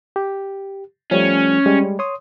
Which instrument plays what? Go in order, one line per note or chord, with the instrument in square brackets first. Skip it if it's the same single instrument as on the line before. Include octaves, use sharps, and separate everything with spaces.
[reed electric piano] G4
[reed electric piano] F3 G3 A3 [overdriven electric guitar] C#4
[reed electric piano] G3 G#3
C#5 C6 D#6